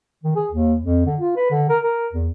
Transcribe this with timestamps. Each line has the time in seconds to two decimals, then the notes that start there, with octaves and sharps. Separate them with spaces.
0.23 D#3
0.36 G#4
0.51 D#2
0.83 F2
1.06 D3
1.20 F4
1.36 B4
1.51 D3
1.69 A#4
1.84 A#4
2.13 E2